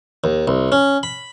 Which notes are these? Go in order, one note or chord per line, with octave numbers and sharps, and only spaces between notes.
D#2
C2
C#4
B5